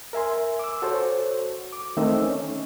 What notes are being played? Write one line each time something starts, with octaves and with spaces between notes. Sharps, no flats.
A#4 E5 G#5 C6
D6 E6
F#4 A4 C5 C#5
D6
D#3 A3 C4 D#4 D#5 E6
C#4